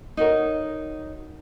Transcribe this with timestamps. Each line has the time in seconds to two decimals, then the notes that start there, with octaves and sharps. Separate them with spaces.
0.17 D#4 F#4 A#4 C#5